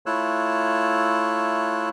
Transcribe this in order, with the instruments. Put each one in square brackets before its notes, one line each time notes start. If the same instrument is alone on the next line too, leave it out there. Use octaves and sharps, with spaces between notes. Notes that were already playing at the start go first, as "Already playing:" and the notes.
[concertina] A3 E4 F4 C#5 E6 F#6